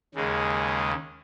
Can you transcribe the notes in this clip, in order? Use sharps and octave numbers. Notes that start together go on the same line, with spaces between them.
D#2 C#3 G#3